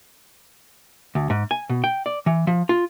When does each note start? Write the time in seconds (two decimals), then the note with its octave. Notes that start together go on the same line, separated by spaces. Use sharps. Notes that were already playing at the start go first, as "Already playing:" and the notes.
1.15 D2
1.30 G#2
1.51 G#5
1.70 B2
1.84 G5
2.06 D5
2.26 E3
2.47 F3
2.69 F4